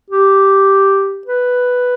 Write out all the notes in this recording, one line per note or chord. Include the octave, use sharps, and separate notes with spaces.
G4
B4